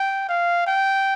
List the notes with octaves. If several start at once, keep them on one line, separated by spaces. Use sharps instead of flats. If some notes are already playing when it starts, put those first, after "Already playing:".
Already playing: G5
F5
G5